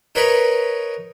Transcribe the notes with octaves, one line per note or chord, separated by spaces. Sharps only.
D#4 A#4 B4 C#5 B5